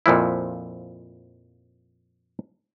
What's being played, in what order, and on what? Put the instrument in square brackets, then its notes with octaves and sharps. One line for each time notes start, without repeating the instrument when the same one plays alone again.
[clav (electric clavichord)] F2 A#2 F3 E4